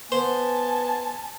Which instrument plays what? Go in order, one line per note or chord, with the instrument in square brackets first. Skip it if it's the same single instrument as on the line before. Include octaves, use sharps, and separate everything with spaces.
[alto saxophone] B3 [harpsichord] C5 [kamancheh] G#5 A5